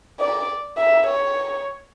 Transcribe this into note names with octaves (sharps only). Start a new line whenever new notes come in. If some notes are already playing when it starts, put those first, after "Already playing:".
D5
E5
C#5